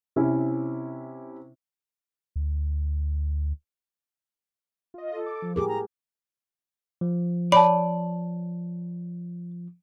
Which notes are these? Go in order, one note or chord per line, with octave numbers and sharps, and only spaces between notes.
C3 C#4 E4
D2
F4 D#5
A4
D6
F3
A2 G4 G#4 A#4 D6
A#5
F3
C#5 D5 A5 B5